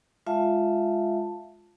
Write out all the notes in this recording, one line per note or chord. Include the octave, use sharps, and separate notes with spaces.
G#3 F4 E5 F5 A5